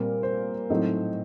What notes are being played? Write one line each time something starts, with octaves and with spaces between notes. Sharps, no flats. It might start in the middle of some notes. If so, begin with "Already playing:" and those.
Already playing: A#2 G3 C4 A#4
C5
A2 F#3 A3 C4 D#4